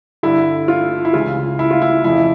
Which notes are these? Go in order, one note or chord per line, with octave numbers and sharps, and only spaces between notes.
G2 D3 E4
F4
E4
C#2 C#3 E3 F4
E4
F4
E4
F2 C#3 E3 E4